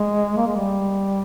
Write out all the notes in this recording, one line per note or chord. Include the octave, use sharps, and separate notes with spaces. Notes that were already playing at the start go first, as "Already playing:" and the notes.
Already playing: G#3
A#3
G#3
G3